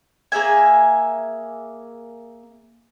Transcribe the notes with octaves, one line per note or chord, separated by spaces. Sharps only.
A#3 G#4 E5 G#5